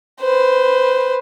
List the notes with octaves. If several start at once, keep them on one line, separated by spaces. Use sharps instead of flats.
B4 C5